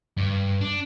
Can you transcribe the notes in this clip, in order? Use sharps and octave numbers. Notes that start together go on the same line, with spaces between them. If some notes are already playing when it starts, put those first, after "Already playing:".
G2
D4